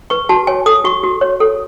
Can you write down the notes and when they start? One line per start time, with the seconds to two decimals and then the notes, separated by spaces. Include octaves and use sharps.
0.10 B4 C#6
0.29 F#4 A5
0.47 C#5 G#5
0.66 A4 D#6
0.84 F#4 C#6
1.03 F#4
1.21 C#5
1.40 A4